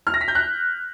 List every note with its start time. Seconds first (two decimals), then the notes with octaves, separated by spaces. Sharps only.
0.07 F6
0.14 A#6
0.21 B6
0.28 G6
0.35 F#6